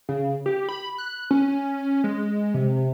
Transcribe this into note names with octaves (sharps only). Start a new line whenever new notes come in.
C#3
G4
B5
F#6
C#4
G#3
C3